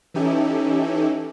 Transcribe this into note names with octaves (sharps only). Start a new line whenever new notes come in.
E3 C#4 D#4 E4 G4 A4